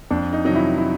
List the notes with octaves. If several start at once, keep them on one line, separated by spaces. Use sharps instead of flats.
F2 D4
D#4
C3 D#3 F#3 D#4
E4
E4